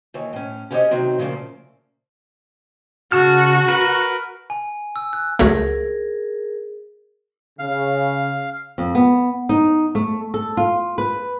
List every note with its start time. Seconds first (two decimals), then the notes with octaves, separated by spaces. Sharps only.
0.14 D#2 E3 C#5
0.33 A2 C#4
0.71 C#4 E4 G4 C5 C#5 D#5
0.91 C3 D#3 F#3 C4
1.19 A#2 C#3 F3 A3 A#3
3.12 C#3 F#4 A5 F6
3.68 A#4 B4
4.50 G#5
4.96 E6
5.13 F#6
5.39 C#2 F#3 A3 G#4 A#4
7.59 C#3 F5
8.78 F2
8.95 B3
9.49 D#4
9.95 A3
10.34 A4
10.57 F4
10.98 B4